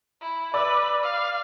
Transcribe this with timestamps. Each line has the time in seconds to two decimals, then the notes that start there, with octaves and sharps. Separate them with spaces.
0.21 E4
0.54 B4 D5 D6 E6
1.03 F5